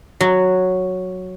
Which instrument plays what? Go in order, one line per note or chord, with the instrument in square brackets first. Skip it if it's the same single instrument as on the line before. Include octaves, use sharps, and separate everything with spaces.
[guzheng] F#3